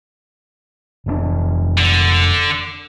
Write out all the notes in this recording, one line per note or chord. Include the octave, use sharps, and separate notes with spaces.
F1 A#2 D4
D3